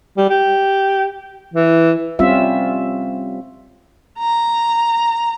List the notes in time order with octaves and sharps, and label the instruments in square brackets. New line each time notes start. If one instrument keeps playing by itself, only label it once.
[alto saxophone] G3
G4
E3
[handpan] G3 C4 C#4 F4 E5
[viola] A#5